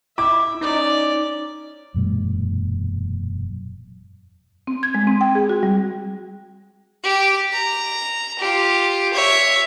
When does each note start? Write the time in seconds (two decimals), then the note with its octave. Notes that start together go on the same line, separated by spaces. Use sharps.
0.18 E4 E5 D6
0.61 C#4 D#4 D5
1.94 E1 F#2 A#2 G#3
4.67 C4
4.83 G#6
4.94 G#3
5.07 C4
5.21 G5
5.35 G#4
5.49 F#4
5.63 G3
7.04 G4
7.53 A#5
8.40 F4 G4
9.14 C#5 E5